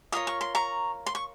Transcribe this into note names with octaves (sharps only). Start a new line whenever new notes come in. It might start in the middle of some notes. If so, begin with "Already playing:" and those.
F4 A#4 C#5 D#6
C#6
C6
A#5 C#6
C6
C#6